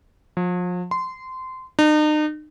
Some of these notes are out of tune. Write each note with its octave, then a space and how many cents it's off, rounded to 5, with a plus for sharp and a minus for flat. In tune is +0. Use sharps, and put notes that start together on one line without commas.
F3 +35
C6 -20
D#4 -40